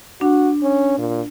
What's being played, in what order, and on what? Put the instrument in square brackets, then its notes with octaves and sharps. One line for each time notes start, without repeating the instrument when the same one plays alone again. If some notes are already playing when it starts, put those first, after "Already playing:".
[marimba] D4 [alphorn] F#4
[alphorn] C#4
A#2